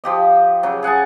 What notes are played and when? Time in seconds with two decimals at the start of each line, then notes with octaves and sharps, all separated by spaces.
0.04 F3 G4 D#5
0.63 C#3 F#3
0.83 G#4 F#5 G#5 A5